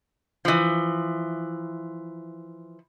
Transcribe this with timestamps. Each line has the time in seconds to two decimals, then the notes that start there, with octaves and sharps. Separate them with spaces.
0.45 E3 F3